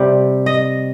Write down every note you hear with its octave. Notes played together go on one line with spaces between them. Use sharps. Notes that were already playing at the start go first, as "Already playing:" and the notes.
Already playing: C3 G3
D#5